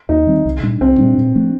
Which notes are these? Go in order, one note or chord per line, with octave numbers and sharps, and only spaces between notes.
D#2 D#4
D#3 G3 C4
C2
A#2 G3 D4
C2 C4
A#2 G3 D4
A#2
F3 A3 D4